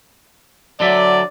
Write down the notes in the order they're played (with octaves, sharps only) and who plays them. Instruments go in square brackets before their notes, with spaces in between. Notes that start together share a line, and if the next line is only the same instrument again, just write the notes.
[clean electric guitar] D3 F#3 E5 [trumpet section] D5